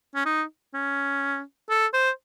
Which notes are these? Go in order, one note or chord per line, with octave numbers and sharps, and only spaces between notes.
C#4
D#4
C#4
A4
C5